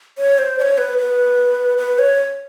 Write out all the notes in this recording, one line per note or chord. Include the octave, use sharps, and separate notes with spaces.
C#5
C5
D5
C#5
B4
B4
B4
C#5